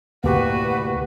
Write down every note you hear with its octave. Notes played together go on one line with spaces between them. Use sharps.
D2 A2 C3 A#3 F#4 G4 B4